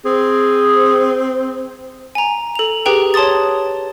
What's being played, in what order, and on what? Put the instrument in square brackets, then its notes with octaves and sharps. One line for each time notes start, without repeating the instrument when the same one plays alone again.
[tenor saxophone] C4 [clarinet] G#4
[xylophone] G#5 A#5
A4 F7
G4 G#4 B4 G5 A#5
C#5 A5 C6 D#6 A6